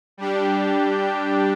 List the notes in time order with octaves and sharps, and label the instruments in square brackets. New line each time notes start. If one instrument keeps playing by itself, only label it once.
[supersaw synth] G3 D4 G4